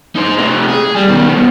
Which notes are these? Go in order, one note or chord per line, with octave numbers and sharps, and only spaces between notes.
D#4 C5
C3 A3
G#4
G3
B2 D#3
C#2 B2